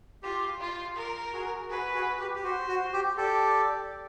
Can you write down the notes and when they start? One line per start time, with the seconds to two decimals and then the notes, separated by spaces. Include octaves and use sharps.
0.23 F4 G4
0.61 F4
0.96 A#4
1.33 F#4 G#4
1.70 F#4 G#4 B4
1.94 F#4 G#4
2.20 G4
2.35 G4
2.44 F#4 C5
2.68 F#4
2.93 G4
3.17 G4 A4 D5